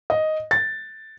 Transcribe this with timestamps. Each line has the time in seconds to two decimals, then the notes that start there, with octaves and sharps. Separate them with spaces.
0.10 D#5
0.51 A6